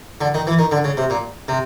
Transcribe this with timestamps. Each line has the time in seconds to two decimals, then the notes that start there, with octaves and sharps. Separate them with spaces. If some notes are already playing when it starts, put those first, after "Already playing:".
0.21 D3
0.34 D#3
0.47 E3
0.59 D#3
0.72 D3
0.84 C#3
0.97 C3
1.10 A#2
1.48 C3